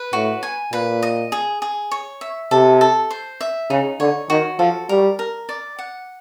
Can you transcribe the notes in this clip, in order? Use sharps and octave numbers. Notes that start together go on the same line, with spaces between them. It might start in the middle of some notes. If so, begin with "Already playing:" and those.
Already playing: B4
A2 F#4
G#5
A#2 B4
D#5
G#4
G#4
C#5
E5
C3 A4
A4
C5
E5
C#3 D#4
D3 C#5
D#3 F#4
F3 A4
G3 A#4
A#4
D5
F#5